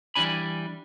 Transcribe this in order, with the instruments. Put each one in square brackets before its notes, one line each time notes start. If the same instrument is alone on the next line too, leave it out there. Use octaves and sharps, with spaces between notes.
[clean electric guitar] E3 G3 D4 G#5 B5